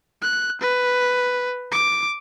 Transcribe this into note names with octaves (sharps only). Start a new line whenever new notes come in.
F#6
B4
D6